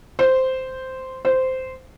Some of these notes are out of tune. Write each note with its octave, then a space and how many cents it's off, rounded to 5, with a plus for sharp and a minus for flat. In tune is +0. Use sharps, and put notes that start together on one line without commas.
C5 -5
C5 -10